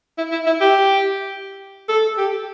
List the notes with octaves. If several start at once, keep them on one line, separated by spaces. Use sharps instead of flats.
E4
E4
E4
G4
A4
G4